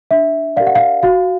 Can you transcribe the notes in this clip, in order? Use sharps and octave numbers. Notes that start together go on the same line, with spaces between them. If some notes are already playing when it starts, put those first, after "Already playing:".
D4 E5
G4 A#4 D5 F5
F#5
F5
F#4 F5